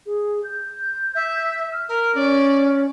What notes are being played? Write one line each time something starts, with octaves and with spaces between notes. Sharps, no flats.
G#4
G6
E5
F6
A#4
C#4 D5